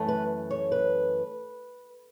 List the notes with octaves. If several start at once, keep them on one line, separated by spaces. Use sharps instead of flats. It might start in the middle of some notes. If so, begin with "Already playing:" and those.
Already playing: F#2 E3 A3
B4
C#5
B4